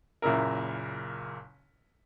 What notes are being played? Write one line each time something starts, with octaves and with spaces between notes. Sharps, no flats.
F#1 A#2 C#3 E4 A#4